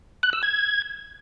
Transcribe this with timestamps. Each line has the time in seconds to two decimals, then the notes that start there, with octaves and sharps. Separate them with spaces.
0.23 F#6
0.33 E6
0.43 G#6